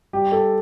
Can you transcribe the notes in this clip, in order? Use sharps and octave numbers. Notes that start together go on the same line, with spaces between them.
G3 G4
A4